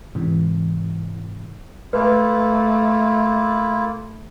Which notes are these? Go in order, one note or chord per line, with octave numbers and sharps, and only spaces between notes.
G#2 C3 E3
A3 A#3 E4 F4 B4